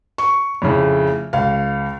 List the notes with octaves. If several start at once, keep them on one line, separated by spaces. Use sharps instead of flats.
C#6
F2 A2 C#3
C#2 F5